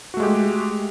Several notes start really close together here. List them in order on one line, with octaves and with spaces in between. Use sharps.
F#4 A3 G#3 G4